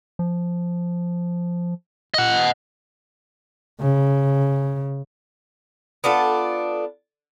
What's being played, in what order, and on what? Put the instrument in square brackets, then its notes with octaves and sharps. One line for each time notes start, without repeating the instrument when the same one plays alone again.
[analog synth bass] F3
[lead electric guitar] D#5 F#5
[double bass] C#3
[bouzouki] B3 D4 F4 A4